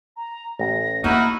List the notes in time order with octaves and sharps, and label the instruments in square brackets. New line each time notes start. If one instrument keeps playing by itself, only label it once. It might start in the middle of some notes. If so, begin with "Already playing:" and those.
[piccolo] A#5
[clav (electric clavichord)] A1 [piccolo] A#6
[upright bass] A#3 [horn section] D#4 E4 F#4 [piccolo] F6